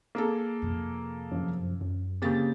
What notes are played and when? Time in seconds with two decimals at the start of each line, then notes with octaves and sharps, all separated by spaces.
0.15 A#3 G#4 A4
0.62 F2 C3
1.31 F#2 F3
1.81 F#2
2.22 C#3 A#3 C4 G4 A6